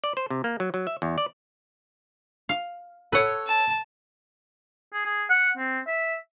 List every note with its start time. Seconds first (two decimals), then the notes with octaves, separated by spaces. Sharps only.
0.04 D5
0.17 C5
0.30 C3
0.44 A#3
0.60 F#3
0.74 F#3
0.87 E5
1.02 E2
1.18 D5
2.49 F5
3.13 A4 B4 C#5 F#5
3.47 A5
4.93 G#4
5.06 G#4
5.30 F#5
5.57 C4
5.87 E5